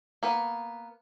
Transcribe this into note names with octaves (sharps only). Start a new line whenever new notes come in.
A#3 B3 B4